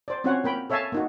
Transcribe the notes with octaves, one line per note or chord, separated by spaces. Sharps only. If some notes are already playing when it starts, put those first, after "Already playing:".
C5 D5
C4 C#4 F4 F#4 C#5 F#5
A#3 A#4 G5 B5
A4 C#5 E5 F5 G#5 A5
A#3 D#4 F#4